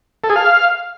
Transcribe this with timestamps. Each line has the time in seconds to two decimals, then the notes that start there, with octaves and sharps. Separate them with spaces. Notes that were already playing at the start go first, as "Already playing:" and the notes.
0.24 A4
0.30 G#4
0.36 F5